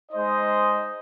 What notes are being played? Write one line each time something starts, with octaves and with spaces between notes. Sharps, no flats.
G#3 D#4 C5 D#5